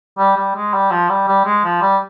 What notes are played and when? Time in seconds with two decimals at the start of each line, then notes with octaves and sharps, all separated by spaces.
0.18 G3
0.36 G3
0.55 G#3
0.73 G3
0.91 F3
1.09 G3
1.27 G3
1.45 G#3
1.64 F3
1.81 G3